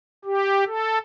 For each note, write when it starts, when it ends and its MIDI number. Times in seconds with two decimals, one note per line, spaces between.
0.25 0.64 67
0.66 0.99 69